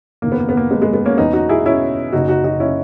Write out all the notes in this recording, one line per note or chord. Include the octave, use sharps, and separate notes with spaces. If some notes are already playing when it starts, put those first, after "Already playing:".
F#1 E2 D#3 A#3
B3
A#3
B3
A#3
G#3 B3
G#3 B3
G#3 B3
A#3 C#4
E1 E2 B2 B3 D#4
D#4 F#4
E4 G#4
C#4 E4
F#1 F#2 C#3 D#4 F#4
D#4 F#4
D#4 F#4
C#4 E4